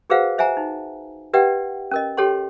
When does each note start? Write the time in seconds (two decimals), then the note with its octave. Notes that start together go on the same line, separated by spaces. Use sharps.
0.10 F#4 G#4 B4 C5 F5 F#5
0.38 C5 E5 F#5 G#5 A#5
0.57 D#4
1.34 G4 B4 D5 E5 F#5 G5
1.91 C#4 A#4 D#5
2.17 G4 A4 C#5 G5 C6